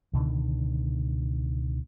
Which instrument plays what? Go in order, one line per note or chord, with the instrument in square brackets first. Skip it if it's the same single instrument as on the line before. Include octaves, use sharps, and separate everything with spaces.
[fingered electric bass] C#2 B2 D3 D#3